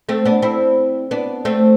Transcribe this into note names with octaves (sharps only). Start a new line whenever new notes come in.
A3 C4
B3 D4
C4 E4
B3 D4
A3 C4